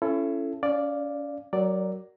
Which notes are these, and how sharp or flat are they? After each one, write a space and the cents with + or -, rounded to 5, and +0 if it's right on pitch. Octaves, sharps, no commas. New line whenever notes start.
C#4 +0 E4 +35 A4 +0
C#4 +35 D5 +0 F5 +0
F#3 +20 A#4 +0 D5 +0